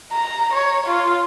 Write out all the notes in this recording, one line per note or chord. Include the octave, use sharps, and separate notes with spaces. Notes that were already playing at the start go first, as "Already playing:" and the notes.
A#5
C#5
F4